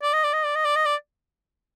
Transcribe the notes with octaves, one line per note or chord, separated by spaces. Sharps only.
D5
D#5
D5
D#5
D5
D#5
D5
D#5
D5